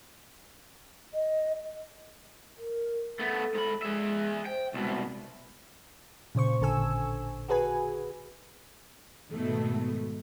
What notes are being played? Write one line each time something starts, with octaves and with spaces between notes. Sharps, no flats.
D#5
A#4
A3 B3 A4
G#2 B5
G#3 G#4 E5
C5 G5
C2 B2 G#3
A#2 C#3 C5 C#6
A1 D3 A4 G#5 E6
F#4 G#4 B4 G#5
G#2 B2 D#3 A3